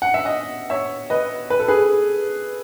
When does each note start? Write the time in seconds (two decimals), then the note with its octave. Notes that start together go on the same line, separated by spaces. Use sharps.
0.02 F#5
0.14 E5
0.25 D#5 F#5
0.70 C#5 E5
1.10 B4 D#5
1.50 B4
1.59 A4
1.68 G#4 B4